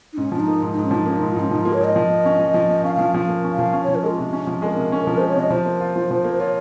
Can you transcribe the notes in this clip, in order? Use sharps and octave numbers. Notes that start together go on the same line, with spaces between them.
D#4
G#2 C#4
F3 C#4
D#4
A#3
G#2
G#2 D#4
C#4
F3 D#4
A#3 C#4
G#2 D#4
F4
G#2 C#4
F3 D#4
A#3 F4
C#5
G#2 D#5
F3
A#3
C#4
F3
F3
A#3
C#4 F5
F3 F5
F3 F5
A#3
C#4
F5
F3
C#4
F3 C#5
A#4
G#3 F4
C3
C#4
F3
G#3 A#4
C3
C#4
F3 A#4
G#3 C5
C#5
C3 D#5
F3 C5
A#3
F4
F3
F3
A#3
F4 C#5